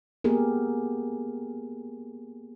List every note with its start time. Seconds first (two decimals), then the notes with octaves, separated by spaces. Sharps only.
0.24 A#3 B3 G4 G#4 A#4